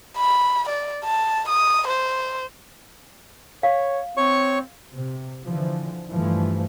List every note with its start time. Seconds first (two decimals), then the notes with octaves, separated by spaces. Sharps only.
0.18 B5
0.69 D5
1.04 A5
1.49 D#6
1.87 C5
3.63 C#5 F5
4.17 C4 C#5 C#6
4.93 C3
5.45 D3 E3 F3
6.11 G2 E3 F3 A3